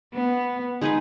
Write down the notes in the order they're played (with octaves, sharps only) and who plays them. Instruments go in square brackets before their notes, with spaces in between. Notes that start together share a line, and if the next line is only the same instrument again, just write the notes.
[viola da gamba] B3
[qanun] G#3 D#4 G#4 B4